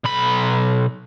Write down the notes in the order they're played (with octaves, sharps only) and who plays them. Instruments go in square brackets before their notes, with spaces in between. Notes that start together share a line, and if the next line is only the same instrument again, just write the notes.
[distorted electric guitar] B1 B5